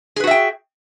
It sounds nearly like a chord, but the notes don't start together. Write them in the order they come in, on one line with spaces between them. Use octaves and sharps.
G#4 B4 F#4 E5 G5